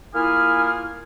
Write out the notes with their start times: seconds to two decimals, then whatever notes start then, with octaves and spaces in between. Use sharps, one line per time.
0.14 A#3 E4 F4 G#4 G#5 F6